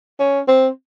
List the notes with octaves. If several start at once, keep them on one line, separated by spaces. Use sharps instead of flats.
C#4
C4